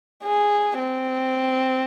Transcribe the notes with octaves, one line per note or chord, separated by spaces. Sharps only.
G#4
C4